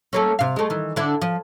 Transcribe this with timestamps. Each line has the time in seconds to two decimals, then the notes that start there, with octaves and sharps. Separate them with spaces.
0.13 A3 A#3 C#4
0.39 C3 F5
0.56 G#3 A3
0.70 D#3 E3
0.96 D3 D4 E4
1.22 F3